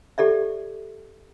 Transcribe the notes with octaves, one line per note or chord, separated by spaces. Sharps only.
G4 A4 D5 E5